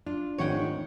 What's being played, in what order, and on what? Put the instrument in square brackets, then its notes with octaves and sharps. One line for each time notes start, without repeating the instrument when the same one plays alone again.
[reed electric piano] D4 [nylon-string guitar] F4
[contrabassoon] F1 [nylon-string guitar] G#2 D#3 F#5 [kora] C#5 G5